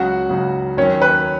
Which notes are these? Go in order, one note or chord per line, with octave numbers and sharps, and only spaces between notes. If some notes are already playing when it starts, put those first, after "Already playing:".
Already playing: C#2 C#3 F#3 F#4 F#5
C#2 C#3 F#3
D#2 D#3 F#3 C#4 C#5
B4